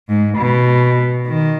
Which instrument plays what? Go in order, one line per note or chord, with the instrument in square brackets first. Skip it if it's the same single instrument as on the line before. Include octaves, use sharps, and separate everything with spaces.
[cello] G#2
B2
D#3